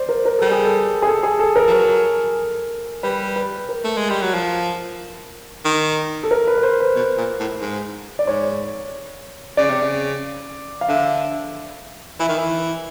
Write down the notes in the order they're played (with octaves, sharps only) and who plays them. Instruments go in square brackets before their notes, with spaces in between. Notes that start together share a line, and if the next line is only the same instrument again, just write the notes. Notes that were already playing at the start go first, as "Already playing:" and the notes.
Already playing: [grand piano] C5 D5
A#4
A#4
[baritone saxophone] G3 [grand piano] A4
[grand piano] G#4
A4
G#4
A4
G#4
A4
A#4
[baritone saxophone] F3
F#3
[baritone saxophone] G3 [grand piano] B4
[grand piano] B4
A#4
[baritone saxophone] A3
G#3
G3
F#3
F3
D#3
[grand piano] A4
A#4
B4
B4
C5
B4
[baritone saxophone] B2
A#2
A2
G#2
[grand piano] D5
[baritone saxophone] G#2 [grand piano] C#5
[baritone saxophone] C#3 [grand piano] D5
[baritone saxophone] C3
C#3
[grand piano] F5
[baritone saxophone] D3 [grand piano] E5
[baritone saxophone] E3 [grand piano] E5
[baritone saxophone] D#3
E3